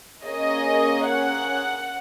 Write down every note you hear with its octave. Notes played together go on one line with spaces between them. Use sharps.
A#3 C#4 G#4 D#5
F#5